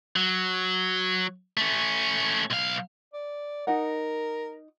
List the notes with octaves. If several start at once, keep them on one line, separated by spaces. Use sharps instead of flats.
F#3
A3 C#4
B1 F5
D5
D#4 A#4 D#5 F#5